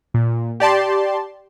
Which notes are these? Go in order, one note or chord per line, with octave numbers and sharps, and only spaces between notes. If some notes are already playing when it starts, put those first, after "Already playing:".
A#2
G4 D5 A5 C6